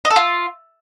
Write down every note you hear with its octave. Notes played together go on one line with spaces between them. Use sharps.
D#5
A4
F4